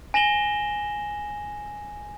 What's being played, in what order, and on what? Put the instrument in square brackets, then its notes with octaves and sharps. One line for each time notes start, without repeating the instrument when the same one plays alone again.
[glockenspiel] G#5 A#6 E7 F#7 G7